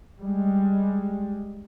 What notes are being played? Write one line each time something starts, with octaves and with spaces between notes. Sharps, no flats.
G3 G#3